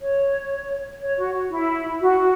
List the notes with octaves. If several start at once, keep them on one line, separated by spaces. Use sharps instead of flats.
C#5
C#5
F#4
E4
F#4